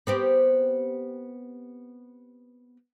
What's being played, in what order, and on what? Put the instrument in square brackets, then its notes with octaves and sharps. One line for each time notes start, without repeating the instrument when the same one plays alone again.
[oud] B3 C4 G4